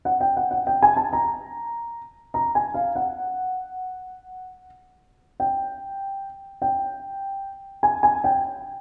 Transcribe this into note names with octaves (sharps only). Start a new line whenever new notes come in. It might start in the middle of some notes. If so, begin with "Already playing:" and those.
F#5
G5
F#5
F#5
G5
G#5
A5
A#5
A#5
G#5
F5
F#5
G5
G5
G#5
G#5
G5